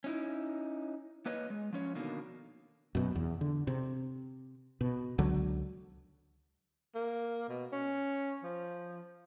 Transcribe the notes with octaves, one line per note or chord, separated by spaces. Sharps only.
C#4 D#4 E4
A#3 B4 C#5 D#5
G#3
F3 C#4 C#5
B2 D3 D#3 A#3
F#2 B2
E2
D3
C3
B2
C#2 D3 F#3
A#3
B2
C#4
F3